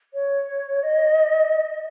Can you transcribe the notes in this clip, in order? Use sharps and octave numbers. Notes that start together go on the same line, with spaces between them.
C#5
D#5